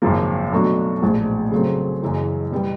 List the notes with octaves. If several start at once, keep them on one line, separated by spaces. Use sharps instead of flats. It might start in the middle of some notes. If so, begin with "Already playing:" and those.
G#1 F#2 C#3 F3 A#3
B2 F#3 A3 D4 F#4
A#1 A2 F3 G#3
C#3 F#3 A3 C4
F#1 F#2 C#3 E3 G#3
B2 G3 B3